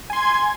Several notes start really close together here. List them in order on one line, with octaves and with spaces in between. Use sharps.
G#5 C6 G#6